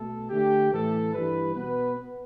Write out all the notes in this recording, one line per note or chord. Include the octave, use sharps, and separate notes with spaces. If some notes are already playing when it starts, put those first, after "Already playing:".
Already playing: B2 A3 A4
D3 A3 G4
A2 E3 A3 A4
G2 E3 G3 B4
B2 B3 B4
B3